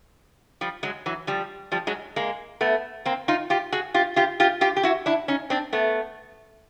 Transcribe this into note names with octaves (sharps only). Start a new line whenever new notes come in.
F3 G3
F#3 G#3
E3 F#3
F3 G3
F3 G3
F#3 G#3
G#3 A#3
A3 B3
A#3 C4
D#4 F4
F4 G4
F#4 G#4
F4 G4
F4 G4
F4 G4
F4 G4
G4
E4 F#4
D4 E4
C#4 D#4
C4 D4
A3 B3